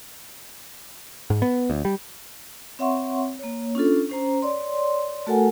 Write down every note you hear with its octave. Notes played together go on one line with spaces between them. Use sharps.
G#2
B3
D2
G3
C4 C#5 E5 F#5 C6 C#6
A#3 C#5
C#4 D4 F4 A4
C#4 C5 A#5
C#5 D5 C6
A3 F#4 A4 A#4 F#5 G#5